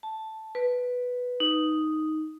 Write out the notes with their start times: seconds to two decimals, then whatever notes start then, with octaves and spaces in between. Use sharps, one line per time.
0.03 A5
0.55 B4
1.40 D#4